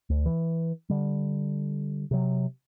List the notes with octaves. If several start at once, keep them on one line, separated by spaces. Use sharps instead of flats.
D2
E3
D3 G3
C3 F#3